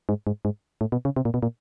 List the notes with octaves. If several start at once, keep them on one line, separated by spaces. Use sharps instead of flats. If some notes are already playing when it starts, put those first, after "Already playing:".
G#2
G#2
G#2
A2
B2
C#3
C3
A#2
B2
A#2